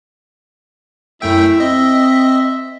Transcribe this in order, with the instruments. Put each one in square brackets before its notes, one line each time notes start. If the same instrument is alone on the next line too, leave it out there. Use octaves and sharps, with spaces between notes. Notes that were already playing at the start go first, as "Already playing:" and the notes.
[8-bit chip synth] F#2 A3 G5 [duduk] E4 [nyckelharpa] E5
[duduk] C4 [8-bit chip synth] D#5